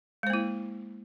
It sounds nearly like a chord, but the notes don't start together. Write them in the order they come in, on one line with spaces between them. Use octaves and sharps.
G#3 C5 A#3 E4